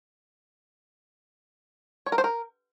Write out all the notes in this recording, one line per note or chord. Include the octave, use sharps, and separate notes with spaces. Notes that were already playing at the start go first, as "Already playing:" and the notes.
C#5
A#4
C5
A#4